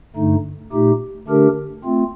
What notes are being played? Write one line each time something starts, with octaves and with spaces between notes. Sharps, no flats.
G2 D3 A3 D#4
A#2 A3 D#4 G4
D3 A3 D4 G4 A#4
A3 C4 F4